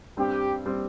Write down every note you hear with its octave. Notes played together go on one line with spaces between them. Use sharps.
G2 G3 C4 G4
G3 C4